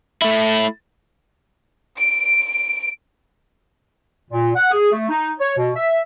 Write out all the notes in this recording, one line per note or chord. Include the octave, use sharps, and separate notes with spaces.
A3 E4
D7
A#2
F#5
G#4
A3
D#4
C#5
B2
E5